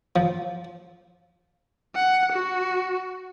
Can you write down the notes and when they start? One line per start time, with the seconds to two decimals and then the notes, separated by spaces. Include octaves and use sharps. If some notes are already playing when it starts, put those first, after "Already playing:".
0.16 F3
1.95 F#5
2.32 F#4